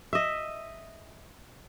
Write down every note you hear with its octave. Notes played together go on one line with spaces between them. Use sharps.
D#5 E5